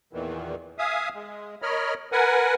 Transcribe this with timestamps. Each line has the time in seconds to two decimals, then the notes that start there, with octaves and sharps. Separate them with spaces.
0.13 E2 A#2 D#3 E3
0.78 E5 F5 G#5 D#6
1.15 G#3
1.62 A#4 C#5 D#5 B5 F6
2.12 A#4 B4 F#5 G#5